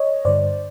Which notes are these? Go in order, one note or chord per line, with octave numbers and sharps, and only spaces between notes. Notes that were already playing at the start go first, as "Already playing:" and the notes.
Already playing: C#5 D#5
G2 D3 G3 C5 D5